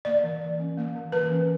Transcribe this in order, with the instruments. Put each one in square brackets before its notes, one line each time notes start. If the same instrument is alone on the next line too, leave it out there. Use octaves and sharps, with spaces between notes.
[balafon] A#3 D5
E3
E3
C#4
A#3
E3
E3 B4
C#4